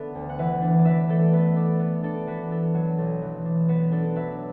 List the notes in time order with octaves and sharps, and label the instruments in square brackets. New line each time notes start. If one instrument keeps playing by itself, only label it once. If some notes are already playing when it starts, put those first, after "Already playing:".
Already playing: [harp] D3 B3 A4 D5 E5
D2
F#5
E3 B4 E5
D4
D5
E3 B4 E5
A3 A4 D5
B3 B4 E5
E5
D4 A4 D5
B3
D4 A4 D5
E3 F#4 B4
B3 A4
F#3 F#4
B1 A4
E3
D4
B3 F#4 B4
D4 A4 D5
F#3 B4 E5